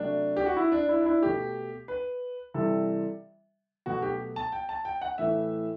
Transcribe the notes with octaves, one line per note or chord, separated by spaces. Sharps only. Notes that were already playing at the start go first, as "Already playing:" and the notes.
Already playing: C3 F#3 A3 D4
G4
F#4
E4
D4
E4
D4
E4
B2 A3 G4
B4
C3 E3 G3 A4
B2 F#3 A3 F#4
G4
A5
G5
A5
G5
F#5
A2 E3 A3 E5